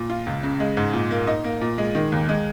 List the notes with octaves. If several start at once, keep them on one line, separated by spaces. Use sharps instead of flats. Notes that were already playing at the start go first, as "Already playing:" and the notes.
Already playing: A#2
F4
C#2
C#3
G#3
G#2
A#2
A#3
D#4
A#3
A#2
G#3
D#3
D#2
G#3